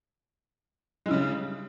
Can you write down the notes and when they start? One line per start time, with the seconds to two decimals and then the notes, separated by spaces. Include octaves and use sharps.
1.06 G#3
1.08 E4
1.11 C#3
1.13 G3